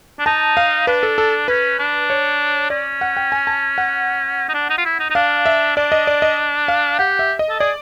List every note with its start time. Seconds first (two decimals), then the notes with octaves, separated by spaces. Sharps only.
0.19 D4
0.26 D#4 A5
0.57 F5
0.87 D4 B4
1.03 A4
1.18 A4
1.48 C#4 B4
1.79 D4
2.10 C#5
2.70 C#4 D5
3.01 F#5
3.17 G5
3.32 G#5
3.47 A5
3.78 F#5
4.48 D#4
4.54 D4
4.70 D#4
4.78 F4
4.85 E4
5.00 D#4
5.10 D#4
5.15 D4 F5
5.46 E5
5.76 D4 D5
5.92 D#5
6.07 D5
6.22 D#5
6.68 F5
6.99 G4 F#5
7.19 E5
7.39 D#5
7.49 A4
7.60 G#4 D5